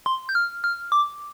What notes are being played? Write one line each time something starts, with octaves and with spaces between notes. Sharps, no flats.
C6
G6
F6
F6
D6